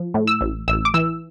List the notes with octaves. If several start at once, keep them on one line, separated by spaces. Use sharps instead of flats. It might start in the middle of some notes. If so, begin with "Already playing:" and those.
Already playing: F3
A2
E6
A1
A1 E6
D6
E3 E6